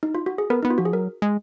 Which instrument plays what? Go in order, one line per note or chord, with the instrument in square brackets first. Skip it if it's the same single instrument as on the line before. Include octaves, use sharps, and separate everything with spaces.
[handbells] D#4
F4
F#4
G#4
[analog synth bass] B3 [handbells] A#4
[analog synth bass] B3 [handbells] D#4
[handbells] F4
[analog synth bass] F3 [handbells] F#4
[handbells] G#4
[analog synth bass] F#3 [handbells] A#4
[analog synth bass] G#3